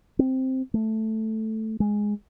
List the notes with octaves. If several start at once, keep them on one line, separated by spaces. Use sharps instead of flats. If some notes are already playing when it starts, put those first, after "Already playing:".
C4
A3
G#3